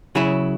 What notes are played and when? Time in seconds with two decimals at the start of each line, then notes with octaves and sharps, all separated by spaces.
0.15 C#3 F#3 E4 G#4